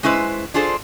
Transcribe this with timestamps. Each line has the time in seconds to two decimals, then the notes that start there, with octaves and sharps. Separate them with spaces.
0.03 G#3 C#4 E4 B4 C5
0.54 D4 F4 G#4 A4 C5